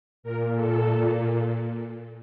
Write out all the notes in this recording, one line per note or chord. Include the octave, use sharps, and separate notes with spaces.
A#2 A#4
A4